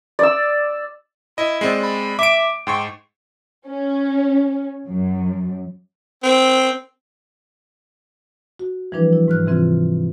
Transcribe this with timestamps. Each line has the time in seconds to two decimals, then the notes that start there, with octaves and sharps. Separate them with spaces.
0.19 D5 E6
1.38 E4 D#5
1.61 G#3 C4 D5
1.83 B5
2.19 E5 D6 D7
2.67 G#2 G5 C6 C#6
3.66 C#4
4.86 F#2
6.23 C4
8.59 F#4
8.92 E3 F3 G3 D4 E4 B4
9.13 E4
9.28 G#2 F6 F#6
9.46 C3 E3 C4 F4